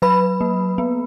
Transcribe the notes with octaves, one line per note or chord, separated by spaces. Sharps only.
F#3 B4 B5
A#3
B3